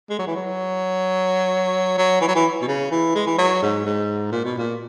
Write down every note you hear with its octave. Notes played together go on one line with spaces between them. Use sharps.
G#3
F#3
E3
F#3
F#3
E3
F#3
E3
B2
C#3
E3
G#3
E3
F#3
G#2
G#2
A#2
B2
A#2